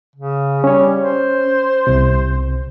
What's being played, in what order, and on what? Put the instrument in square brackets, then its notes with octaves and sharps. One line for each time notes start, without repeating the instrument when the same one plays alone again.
[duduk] C#3
[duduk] G3 [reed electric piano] C#4 C#5
[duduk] C5
[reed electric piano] C2 C3